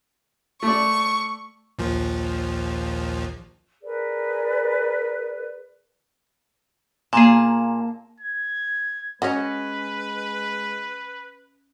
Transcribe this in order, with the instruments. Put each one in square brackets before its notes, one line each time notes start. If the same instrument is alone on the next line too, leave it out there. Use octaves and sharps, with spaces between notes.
[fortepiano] A3 D5 [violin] C#6
[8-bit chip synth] A#1 D#2 F3
[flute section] G#4 A#4 B4 D5
[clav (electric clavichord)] A#2 G#4 [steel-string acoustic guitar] A#3 A5
[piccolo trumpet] G#6
[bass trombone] G#3 [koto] C#4 D#5 [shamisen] F#4 C#5 [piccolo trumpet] B4